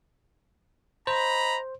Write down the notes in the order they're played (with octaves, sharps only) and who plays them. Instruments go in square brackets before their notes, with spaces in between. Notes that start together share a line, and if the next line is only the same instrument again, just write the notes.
[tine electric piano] C5 [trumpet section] D#5 A#5 B5